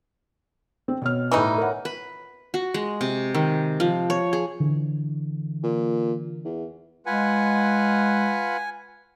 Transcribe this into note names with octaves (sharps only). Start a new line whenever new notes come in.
C4
B2 C#5 F6
A2 E3 G3 D#4 D#5 C#6
A#4 C#5 F#5
B4
F#4
G#3
C3
D#3
F3
C#5
G#4
D3 E3
A#2
E2
G#3 F4 B4 F#5 G#5